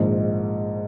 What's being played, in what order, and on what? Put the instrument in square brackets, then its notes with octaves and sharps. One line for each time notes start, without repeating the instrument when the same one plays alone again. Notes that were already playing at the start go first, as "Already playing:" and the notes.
Already playing: [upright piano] A#1 G#2 D#3 G#3